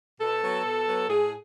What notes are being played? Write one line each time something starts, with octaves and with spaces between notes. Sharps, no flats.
B2 A4
F#3 B3
B2
F#3 B3
A2 G#4